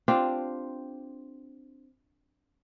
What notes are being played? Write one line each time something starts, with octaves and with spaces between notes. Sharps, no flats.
C4 D4 F4 G4